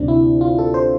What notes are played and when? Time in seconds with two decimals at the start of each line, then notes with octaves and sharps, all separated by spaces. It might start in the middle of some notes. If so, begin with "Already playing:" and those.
Already playing: D2 C3 G3 D4
0.08 E4
0.41 F4
0.59 A4
0.74 C5